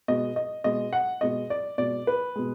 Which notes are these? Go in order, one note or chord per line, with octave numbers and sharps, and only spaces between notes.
B2 G#3 D#5
D#5
B2 G#3 D#5
F#5
B2 G#3 D#5
D5
B2 G#3 D5
B4
B2 G#3